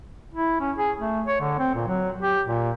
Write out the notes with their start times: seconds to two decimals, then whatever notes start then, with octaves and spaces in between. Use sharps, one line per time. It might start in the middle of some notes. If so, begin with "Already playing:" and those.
0.34 E4
0.60 C#4
0.78 G#4
1.00 A3
1.27 C#5
1.40 D3
1.59 C4
1.75 A#2
1.88 F#3
2.22 G4
2.47 A#2